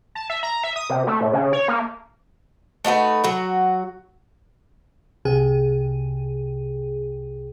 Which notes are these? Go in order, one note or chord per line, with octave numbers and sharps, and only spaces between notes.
A5
E5
A#5
E5
D#6
C3
A3
A2
C#3
C#5
A#3
A3 D#4 F#4 B4
F#3 F#4
C2 C3 G#4